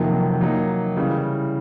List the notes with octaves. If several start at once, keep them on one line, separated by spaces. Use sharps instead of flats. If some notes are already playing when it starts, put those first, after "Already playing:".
Already playing: F2 C3 D#3 F#3 A#3
F#3 A#3 D#4
C#3 E3 G3